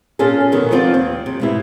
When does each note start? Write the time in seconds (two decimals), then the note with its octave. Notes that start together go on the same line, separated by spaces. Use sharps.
0.19 A#2 C#4 F4 G#4 A4
0.52 B2 D#3 B3
0.71 F3 B3 C4 F4 D5
0.94 D#2
1.26 C3
1.40 G#2 B2 E4